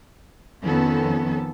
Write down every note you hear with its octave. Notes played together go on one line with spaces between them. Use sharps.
F2 D#3 F3 B3 C#4 A4